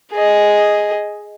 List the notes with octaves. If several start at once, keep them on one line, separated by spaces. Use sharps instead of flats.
G#4 D#5